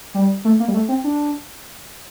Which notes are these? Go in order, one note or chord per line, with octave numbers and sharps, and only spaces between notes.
G3
A3
A#3
G3
A3
C4
D4